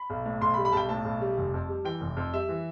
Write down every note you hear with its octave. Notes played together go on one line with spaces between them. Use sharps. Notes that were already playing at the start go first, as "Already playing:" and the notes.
Already playing: B5
B1
A2
B1 C6
B5
G3
B5
B1 G5 A5
A2 A5
B1
G3
F1
F2
G3
E3 G5
F1
F2
G3 E5
E3